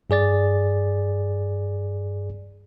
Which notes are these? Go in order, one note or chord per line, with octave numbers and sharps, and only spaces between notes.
G2 G#4 D5 A6